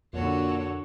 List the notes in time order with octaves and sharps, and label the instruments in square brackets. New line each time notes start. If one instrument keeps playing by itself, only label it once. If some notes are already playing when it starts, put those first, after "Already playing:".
[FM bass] F2 [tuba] A#2 [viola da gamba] D3 C#5 [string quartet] F#4 A4 F#5